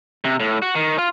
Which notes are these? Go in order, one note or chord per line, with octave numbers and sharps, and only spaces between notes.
C3
A2
F#4
D#3
F4